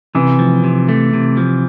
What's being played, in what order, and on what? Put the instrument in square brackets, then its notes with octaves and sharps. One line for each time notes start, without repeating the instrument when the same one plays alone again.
[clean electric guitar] C3 [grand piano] E3
[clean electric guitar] F3
C3
A3
C3
F3